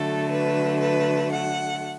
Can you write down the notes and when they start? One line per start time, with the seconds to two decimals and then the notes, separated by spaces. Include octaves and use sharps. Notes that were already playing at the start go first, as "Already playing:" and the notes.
Already playing: D3 F#3 A3 A4
0.31 B4
0.81 B4
1.32 F#5